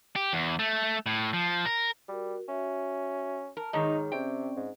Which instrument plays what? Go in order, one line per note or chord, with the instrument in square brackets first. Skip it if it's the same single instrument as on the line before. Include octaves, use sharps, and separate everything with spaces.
[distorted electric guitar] G4
E2
A3
A2
F3
A#4
[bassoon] G3 [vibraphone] F#4 A#4
[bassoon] C#4 [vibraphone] F#4 E5
[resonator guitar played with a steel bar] A#4 [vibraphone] A5
[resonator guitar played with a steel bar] G#2 D#3 [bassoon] D#4 [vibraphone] G#4 C#5
[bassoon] C3 [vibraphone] C4 C#4 D5 [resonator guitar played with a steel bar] G5
[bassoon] G#2